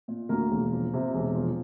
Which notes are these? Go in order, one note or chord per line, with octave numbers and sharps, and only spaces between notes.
A#2
D2 A#3 A#4
E1
F3
C3
E1
F3